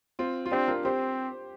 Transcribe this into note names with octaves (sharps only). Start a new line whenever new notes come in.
C4 F4
F4
C4 D4 G4
F4 A#4
C4 G4 C5